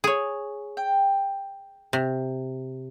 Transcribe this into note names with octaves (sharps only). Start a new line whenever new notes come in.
G#4 C#5
G5
C3